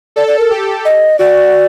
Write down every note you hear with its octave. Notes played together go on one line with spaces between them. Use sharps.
A4 D5
D5
A#4
G4
D#5
F#4 D5